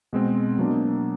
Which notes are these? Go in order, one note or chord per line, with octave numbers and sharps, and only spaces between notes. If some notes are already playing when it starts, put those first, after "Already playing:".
B2 G#3 C4
B2 F#3 A#3 D4